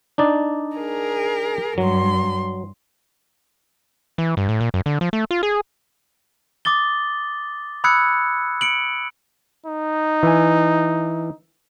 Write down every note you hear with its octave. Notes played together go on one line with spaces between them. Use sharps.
D4 D#4 D5
G#4 A#4
G2 F#3 C6
E3
G2
A2
A#2
F#2
D3
F3
A3
F4
G#4
D6 D#6 A6 G7
B5 D#6 E6 F#6 G#6 C#7
C#7 D7 F#7
D#4
E3 G#5